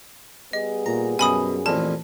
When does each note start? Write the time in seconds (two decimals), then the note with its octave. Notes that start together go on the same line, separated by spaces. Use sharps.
0.53 G3 B3 G#4 D#5
0.86 A#2 A#5
1.19 F#2 B2 G#5 B5 D#6
1.66 A1 F2 A#2 A5